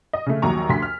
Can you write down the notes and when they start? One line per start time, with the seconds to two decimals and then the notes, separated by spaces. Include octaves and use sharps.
0.13 D#5
0.26 C#3 A3
0.42 A#1 D#2 F#3 A#5 C#6
0.69 D2 C6 B6
0.82 F6